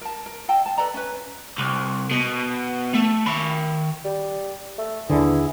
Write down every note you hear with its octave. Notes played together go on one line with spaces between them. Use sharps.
A#4 A5
A#4
A4 D#5 G5 A5
A5
A4 B4 D5 A#5
C#4 B4
C2
B2
A3
D#3 B5
G3
A3
D#2 D3 E3 E4 G#4